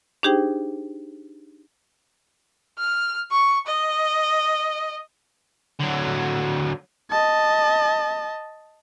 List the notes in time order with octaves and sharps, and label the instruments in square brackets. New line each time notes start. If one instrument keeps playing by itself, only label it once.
[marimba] D4 D#4 G4 G#4 C5 G5
[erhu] F6
C#6
D#5
[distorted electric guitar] D3 F#3
[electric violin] D#5 A5